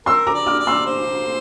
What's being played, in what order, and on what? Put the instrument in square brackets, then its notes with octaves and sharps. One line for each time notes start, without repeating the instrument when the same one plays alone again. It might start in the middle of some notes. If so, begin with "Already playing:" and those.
[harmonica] A#4 [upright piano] C6 E6
[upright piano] A#5 D6
[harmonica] D5
[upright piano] D6 F6
[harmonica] D5
[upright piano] C6 E6
[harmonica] C5